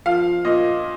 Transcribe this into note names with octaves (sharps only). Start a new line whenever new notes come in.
F3 F5
A#2 D#5